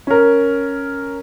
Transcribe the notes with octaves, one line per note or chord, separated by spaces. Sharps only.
C#4 A#4